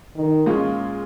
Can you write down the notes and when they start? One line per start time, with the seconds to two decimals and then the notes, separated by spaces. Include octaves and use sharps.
0.16 D#3
0.46 A#2 G#3 C#4 F4